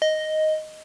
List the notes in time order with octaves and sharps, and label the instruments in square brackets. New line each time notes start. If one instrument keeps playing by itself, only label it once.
[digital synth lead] D#5